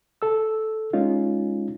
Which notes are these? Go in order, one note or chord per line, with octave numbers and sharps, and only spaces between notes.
A4 E6
G#3 C#4 D#4 F4